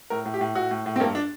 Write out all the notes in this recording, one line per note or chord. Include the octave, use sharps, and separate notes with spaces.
A2 A#4
A2
G4
A2
A2 F#4
A2
A2
C4
G2 A#3
D4